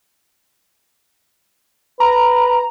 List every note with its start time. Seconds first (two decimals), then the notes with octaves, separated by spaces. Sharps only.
2.00 B4 A#5